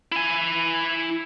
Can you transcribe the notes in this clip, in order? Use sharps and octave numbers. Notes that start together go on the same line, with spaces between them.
E4 G#5